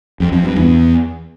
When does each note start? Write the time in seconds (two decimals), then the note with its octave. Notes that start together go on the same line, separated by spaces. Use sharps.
0.20 F2
0.32 F2
0.44 G2
0.56 E2